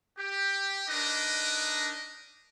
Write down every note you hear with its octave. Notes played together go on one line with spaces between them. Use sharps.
G4
D4 D#4 A#4 B4 D#5